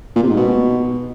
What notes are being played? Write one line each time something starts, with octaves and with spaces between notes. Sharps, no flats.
A#2
C3
G#2
B2